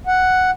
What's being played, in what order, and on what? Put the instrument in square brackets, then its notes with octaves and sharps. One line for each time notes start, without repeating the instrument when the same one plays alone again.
[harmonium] F#5